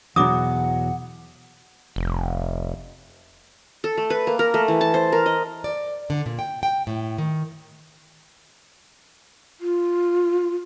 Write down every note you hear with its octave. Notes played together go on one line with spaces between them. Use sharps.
E2 B2 F#3 F#4 F#5 D6 D#6
F1
A4
A3
B4
A#3
A#4
A3
E3
A5
C5
A#4
D#5
D5
D3
A#2
G5
G5
A2
D#3
F4